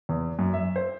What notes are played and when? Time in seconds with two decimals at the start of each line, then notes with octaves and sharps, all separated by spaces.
0.09 E2
0.39 F#2
0.53 E5
0.76 C5